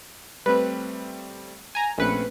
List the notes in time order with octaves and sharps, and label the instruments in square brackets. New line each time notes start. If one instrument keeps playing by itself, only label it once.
[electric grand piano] G3 A3 C4 [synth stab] B4
[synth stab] G#5 A#5
[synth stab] A#1 B4 C#7 [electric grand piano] A3 C4 C#4